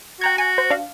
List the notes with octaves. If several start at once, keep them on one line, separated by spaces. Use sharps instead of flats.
F#4 G5 A#5 G#6
F#4 G#5
C5
D4 F5